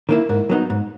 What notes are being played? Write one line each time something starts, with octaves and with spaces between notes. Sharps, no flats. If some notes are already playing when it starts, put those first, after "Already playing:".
D#3 A#3 E4 A#4
G#2 A#4
F#3 B3 D#4
G#2